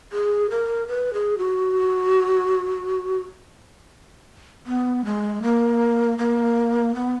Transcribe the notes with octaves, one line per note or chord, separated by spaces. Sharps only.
G#4
A#4
B4
G#4
F#4
B3
G#3
A#3
A#3
B3